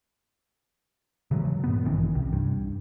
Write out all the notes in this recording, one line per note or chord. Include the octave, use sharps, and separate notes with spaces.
C#3 E3 F#3 G#3
G2 A#2 B3
A1 D#3 E3 C#4
C2 C3
G2